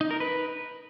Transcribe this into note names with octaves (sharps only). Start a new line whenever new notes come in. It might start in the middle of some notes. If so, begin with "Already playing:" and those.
D#4
A#4
B4